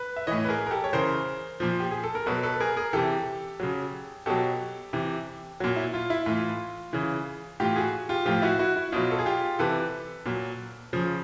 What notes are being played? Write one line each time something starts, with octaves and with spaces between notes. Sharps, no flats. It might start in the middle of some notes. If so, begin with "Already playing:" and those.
Already playing: B4
E5
A2 E3 C#5 D#5
B4
G#4 A#4
A#4
G4 A4
C#5
C#3 E3 A#4 C5
A#2 F3
G4
G#4
A4
A#4
B2 F#3 A4 B4
A4 B4
G#4 A#4
G#4 A#4
C3 E3 G4 A4
C#3 F#3
B2 F#3 G4 A4
C3 E3
A#2 F#3
E4
F4
E4
A2 E3 F4
C#3 E3
A2 E3 F4 G4
F#4 G#4
F4 G4
A2 F3 F4 G4
E4 F#4
E4 F#4
E4
B2 F#3 F4
A4
G#4
F4 G4
C3 E3 A4 B4
A#2 F#3
C#3 F3